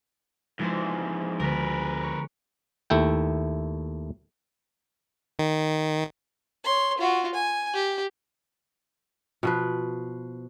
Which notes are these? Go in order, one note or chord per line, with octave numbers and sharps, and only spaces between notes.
G#2 E3 F3 G#3 C5
D2 G#3 B3 A#4 B4
C#5
D#2 A3 E4 G5
D#3
C#5 C6
F4 F#4
G#5
G4
B2 F3 B4